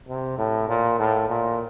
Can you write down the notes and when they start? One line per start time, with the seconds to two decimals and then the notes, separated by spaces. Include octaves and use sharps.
0.09 C3
0.38 A2
0.69 A#2
0.99 A2
1.29 A#2